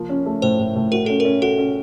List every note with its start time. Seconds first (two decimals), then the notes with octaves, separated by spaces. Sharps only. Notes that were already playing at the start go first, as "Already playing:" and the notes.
Already playing: F3 A#3
0.09 C#4
0.26 A3
0.42 A2 C5
0.59 A2
0.76 A2
0.92 F#4 A#4
1.06 C#4 A4
1.20 A#4
1.25 C#4
1.42 F#4 A4
1.58 C#4